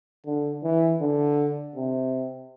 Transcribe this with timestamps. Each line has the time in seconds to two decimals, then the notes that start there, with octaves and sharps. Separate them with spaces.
0.26 D3
0.63 E3
1.01 D3
1.76 C3